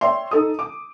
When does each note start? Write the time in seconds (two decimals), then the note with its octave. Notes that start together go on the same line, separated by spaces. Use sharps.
0.01 C#5 D5 E5 G5 C6
0.31 D#4 A4 D#6
0.59 D6